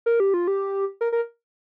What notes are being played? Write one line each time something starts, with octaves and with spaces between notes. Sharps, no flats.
A#4
G4
F4
G4
A#4
A#4